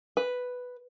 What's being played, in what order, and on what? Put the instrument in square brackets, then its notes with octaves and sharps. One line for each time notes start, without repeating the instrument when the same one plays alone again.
[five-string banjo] B4